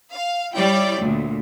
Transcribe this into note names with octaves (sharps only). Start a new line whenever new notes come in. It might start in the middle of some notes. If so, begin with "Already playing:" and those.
F5
G3 E4 C#5 D5 G5
D2 A#2